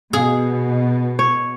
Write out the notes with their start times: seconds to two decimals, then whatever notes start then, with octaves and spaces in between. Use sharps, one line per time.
0.13 B2 G#4
1.19 C#5